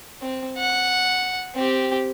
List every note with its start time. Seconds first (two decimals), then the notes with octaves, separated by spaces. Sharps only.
0.22 C4
0.58 F#5
1.55 C4 G4